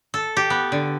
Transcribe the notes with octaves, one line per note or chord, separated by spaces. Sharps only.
A4
G4
B3
D3